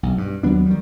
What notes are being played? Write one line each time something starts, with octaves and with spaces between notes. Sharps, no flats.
B1
G2
D#2 F#3 B3 D4
D#3 G3